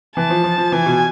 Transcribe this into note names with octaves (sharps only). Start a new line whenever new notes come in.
E3 A5
F3
F3
F3
E3 G#5
B2